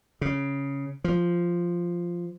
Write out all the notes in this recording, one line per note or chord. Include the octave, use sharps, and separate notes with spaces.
C#3
F3